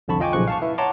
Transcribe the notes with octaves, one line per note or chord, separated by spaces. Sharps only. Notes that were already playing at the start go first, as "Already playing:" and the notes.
C2 F2 D3 A5 B5 C#6
F4 D#5 G5 G#5 C#6 D6
B1 A#2 C#3 F3 C#6 F#6
F5 A5 C#6
E4 B4 E5
C#5 F#5 A5 A#5 C6 D6